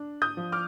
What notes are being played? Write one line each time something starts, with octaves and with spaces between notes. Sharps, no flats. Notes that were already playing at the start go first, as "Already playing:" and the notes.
Already playing: D4
D#6 G6
F3
D6 F6